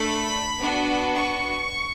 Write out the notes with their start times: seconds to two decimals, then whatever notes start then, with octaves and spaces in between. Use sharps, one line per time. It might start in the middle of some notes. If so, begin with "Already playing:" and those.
Already playing: A3 D4 A4 B5
0.59 B3 D4 F#4
1.15 C#6